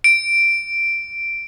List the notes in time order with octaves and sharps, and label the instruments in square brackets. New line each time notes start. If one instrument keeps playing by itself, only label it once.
[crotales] D7